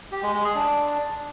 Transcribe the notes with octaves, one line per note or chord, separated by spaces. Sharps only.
G4
G#3
G#3
G#4
D4